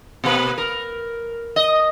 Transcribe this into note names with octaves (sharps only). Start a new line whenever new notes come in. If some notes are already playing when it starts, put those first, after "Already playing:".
B2 A#3 B4
A#4
D#5